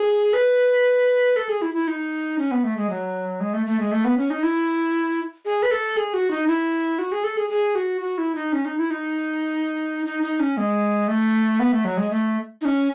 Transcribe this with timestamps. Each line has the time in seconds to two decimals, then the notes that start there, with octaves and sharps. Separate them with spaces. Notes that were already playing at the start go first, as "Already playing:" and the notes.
Already playing: G#4
0.33 B4
1.36 A4
1.49 G#4
1.62 E4
1.74 E4
1.88 D#4
2.38 C#4
2.51 B3
2.64 A3
2.77 G#3
2.90 F#3
3.40 G#3
3.54 A3
3.66 A3
3.80 G#3
3.91 A3
4.05 B3
4.18 C#4
4.30 D#4
4.43 E4
5.45 G#4
5.63 B4
5.71 A4
5.97 G#4
6.14 F#4
6.31 D#4
6.47 E4
6.99 F#4
7.12 G#4
7.24 A4
7.37 G#4
7.50 G#4
7.75 F#4
8.01 F#4
8.18 E4
8.35 D#4
8.53 C#4
8.65 D#4
8.78 E4
8.91 D#4
10.06 D#4
10.23 D#4
10.40 C#4
10.57 G#3
11.08 A3
11.60 B3
11.72 A3
11.85 F#3
11.97 G#3
12.10 A3
12.61 D#4
12.65 C#4